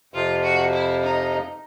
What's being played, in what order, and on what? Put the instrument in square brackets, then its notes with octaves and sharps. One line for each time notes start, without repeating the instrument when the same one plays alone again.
[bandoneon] F2 C3 F3 [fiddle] F4
[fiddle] F#4
E4
D#4